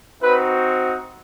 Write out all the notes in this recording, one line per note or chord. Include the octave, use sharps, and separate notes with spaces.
C4 D#4 F#4 B4